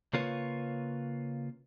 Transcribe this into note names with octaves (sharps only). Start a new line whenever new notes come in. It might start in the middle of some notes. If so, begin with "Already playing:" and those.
C#3 A#3 F4 B4 C#5